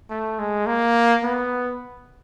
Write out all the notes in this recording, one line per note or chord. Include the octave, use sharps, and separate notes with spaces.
A3
G#3
A#3
B3